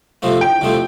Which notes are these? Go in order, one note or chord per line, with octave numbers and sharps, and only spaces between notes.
F2 C3 F3 A3 C4
G5
F2 C3 F3 A3 C4